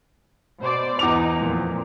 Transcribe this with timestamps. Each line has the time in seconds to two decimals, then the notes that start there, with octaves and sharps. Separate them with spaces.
0.61 B2 C5 D5
0.99 E2 D#4 D6 F7
1.36 F2 A#2